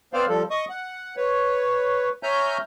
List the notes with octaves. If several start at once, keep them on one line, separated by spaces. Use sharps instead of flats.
B3 C4 C5 D5 F5
F3 G3 A4
D#5 C#6 D#6
F#5
B4 C#5
C#5 E5 G#5 A#5 F6 G6